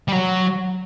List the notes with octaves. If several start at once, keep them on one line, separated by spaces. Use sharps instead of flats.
G3
F#3